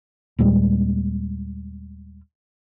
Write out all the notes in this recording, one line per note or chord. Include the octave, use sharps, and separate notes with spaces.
D#2 A#2 G3 G#3